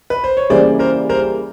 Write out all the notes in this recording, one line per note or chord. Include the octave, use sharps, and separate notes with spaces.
B4
C5
C#5
C#3 E3 G3 A#3 C5 D5
A#4 C5
A#4 C5